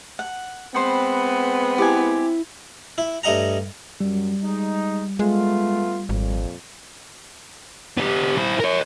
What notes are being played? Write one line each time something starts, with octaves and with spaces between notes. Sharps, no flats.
F#5
G#3 B3 C4 B4 C5 G5
E4 G4 G#5
E4
G2 A3 D#5 F#5 A#5
F#2 G3
G#3 D#4
G#3 A3 B3 F4
G#1 F2 A#2
B3 G4
E4 C5
A#4 C#5